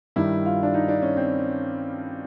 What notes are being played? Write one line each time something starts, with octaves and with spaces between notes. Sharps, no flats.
G2 D#3 G3 E4
F4
D4
D#4
D4
C#4
C4